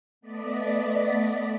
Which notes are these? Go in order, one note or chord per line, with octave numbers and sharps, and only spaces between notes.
A3 B3 D5 D#5 B6